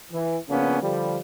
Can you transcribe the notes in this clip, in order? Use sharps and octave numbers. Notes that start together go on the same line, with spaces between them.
E3
C#3 F3 A#3 B3 C#4 D4
D3 F3 G3